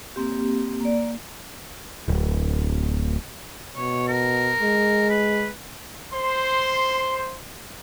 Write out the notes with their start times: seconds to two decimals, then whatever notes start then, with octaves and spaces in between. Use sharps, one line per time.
0.16 A#3 C4 G4
0.81 A#3 D5
2.08 D1
3.77 B2 C#5
4.08 A#4
4.61 G#3
5.10 B4
6.14 C5 C6